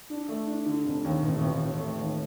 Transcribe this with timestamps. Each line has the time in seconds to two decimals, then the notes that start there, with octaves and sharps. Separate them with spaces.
0.10 D4
0.29 A3
0.47 D4
0.66 D3
0.85 F1
1.04 D#2
1.23 A1
1.41 A1
1.60 A1
1.79 A3
1.98 D#2